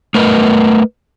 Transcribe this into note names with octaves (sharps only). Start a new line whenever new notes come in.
A3 A#4 B4 D#5